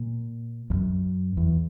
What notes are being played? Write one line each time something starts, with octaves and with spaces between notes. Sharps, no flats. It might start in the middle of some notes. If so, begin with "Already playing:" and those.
Already playing: A#2
E2
F#2
E2